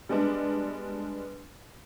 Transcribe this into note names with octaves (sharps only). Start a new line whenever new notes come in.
G3 G#3 B3 D4